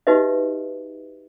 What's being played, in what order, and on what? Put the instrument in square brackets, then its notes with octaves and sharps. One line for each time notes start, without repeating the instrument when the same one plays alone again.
[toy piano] D#4 F#4 G4 B4 D#5 E5